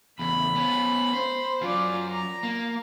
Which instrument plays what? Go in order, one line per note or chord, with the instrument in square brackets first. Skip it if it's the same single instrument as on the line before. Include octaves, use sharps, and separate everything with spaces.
[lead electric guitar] E2 C#3 [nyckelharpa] B5
[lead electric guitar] B3 C#4
C5
[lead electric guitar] F#3 C#4 [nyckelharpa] F4 D5
[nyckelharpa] A#5
[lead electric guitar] A#3